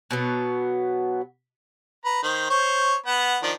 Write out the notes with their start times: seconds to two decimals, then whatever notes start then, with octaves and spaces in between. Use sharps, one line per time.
0.11 B2 F#3 B3
2.05 B4 A#5
2.23 D#3 C5
2.50 C5 C#5
3.06 B3 F#5
3.43 D#3 F3 D4